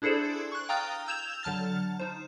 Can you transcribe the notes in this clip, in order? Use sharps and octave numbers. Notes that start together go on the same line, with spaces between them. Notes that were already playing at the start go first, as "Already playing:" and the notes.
D4 E4 G#4 A4 C5 D5
C#6 F#6
F5 G5 A#5 D#6 F6 A6
E6 G6 G#6 E7 F7
D3 F#3 A5 F6 A6
D#4 C5